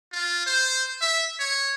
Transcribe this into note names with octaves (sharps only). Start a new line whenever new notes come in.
F4
C5
E5
C#5